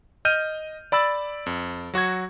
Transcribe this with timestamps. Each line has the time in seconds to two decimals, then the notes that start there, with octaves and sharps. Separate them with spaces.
0.25 D#5 F6 G6 D#7
0.92 D5 B5 E6 A6
1.46 F2
1.94 F#3 F#4 C#6 G#6